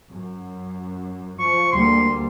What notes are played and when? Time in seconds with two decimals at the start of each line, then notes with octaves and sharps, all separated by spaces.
0.10 F#2
1.39 F3 C#6
1.72 D2 G3 A#3 C6